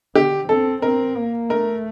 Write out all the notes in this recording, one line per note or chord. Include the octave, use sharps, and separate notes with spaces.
D3 G4
C4 A4
C4 A#4
A#3
A3 A#4